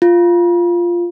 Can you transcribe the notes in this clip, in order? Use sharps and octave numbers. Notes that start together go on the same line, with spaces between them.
F4